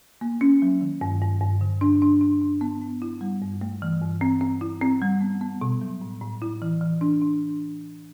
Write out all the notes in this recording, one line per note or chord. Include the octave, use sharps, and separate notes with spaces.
A#3
C#4
F#3
D#3
G2
G2
G2
D3
D4
D4
D4
D4
B3
B3
E4
G3
G2
A3
E3
G2
C4
C4
E4
C4
G3
B3
B3
B2
F#3
A2
A2
E4
E3
E3
D4
D4